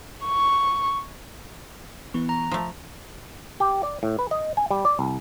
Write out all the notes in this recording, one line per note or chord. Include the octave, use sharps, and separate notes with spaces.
C#6
E3 B3 C#6
A#5
F3 A3
G4
D5
A2
B4
D#5
G#5
G3
D5
C2